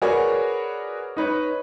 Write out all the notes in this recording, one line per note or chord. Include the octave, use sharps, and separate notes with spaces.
F#4 G#4 A#4 B4 C#5 D5
D#4 B4 C#5